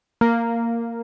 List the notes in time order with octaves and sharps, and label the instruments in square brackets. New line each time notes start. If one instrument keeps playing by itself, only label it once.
[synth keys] A#3